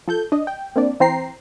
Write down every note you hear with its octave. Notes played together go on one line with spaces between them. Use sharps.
F3 A4 G6
D4 D#5
G5
A#3 C4 D4 D5
E3 C4 C5 G5 A#5 C7